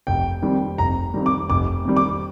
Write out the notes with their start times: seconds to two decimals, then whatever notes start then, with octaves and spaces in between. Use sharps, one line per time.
0.07 F1 G5
0.42 F2 D#3 G3
0.78 F1 A#5
1.14 F2 D#3 G3
1.26 D6
1.50 F1 D6
1.85 F2 D#3 G3
1.97 D6